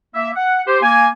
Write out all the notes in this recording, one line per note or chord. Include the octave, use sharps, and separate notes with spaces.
A#3 E5
F#5
G4 C5
A#3 G#5